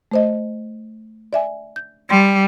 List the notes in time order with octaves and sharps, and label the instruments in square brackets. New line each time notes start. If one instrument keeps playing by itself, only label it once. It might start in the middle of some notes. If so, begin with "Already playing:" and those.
[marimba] A3 C5 D#5
D5 E5 G#5
G6
[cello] G3 [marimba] G5 C6